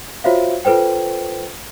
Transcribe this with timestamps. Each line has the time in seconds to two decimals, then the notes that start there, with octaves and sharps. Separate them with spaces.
0.24 F4 F#4 C5 C#5 E5 F5
0.65 F4 A4 B4 C5 G5